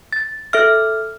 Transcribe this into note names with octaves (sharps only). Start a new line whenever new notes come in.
A6
A4 E5 F6